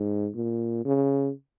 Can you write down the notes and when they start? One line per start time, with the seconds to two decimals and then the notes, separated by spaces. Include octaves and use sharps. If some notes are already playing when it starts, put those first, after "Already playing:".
Already playing: G#2
0.35 A#2
0.85 C#3